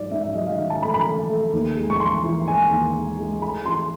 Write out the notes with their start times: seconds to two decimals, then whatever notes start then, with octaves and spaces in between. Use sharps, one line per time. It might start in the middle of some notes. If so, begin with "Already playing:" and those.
Already playing: G#2 F#3 D5
0.11 G#2 E5
0.23 E5
0.35 F#3 D#5
0.47 F5
0.58 D#3 E5
0.70 A5
0.82 A3 B5
0.94 B5
1.06 A3
1.30 A3
1.53 D#2
1.77 G#3
1.90 C#6
2.00 G#3 C6
2.24 E3
2.47 G#3 G#5
2.71 D#2
2.95 G#3
3.19 G#3
3.42 A3 B5
3.66 E3 C6